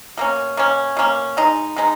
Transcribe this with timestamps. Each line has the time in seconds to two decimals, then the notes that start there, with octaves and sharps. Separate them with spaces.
0.18 B2 A#3 C#4
0.57 B2 A#3 C#4
0.97 B2 A#3 C#4
1.37 B2 G#3 D#4
1.76 B2 G#3 D#4